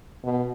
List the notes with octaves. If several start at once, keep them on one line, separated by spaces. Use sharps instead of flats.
B2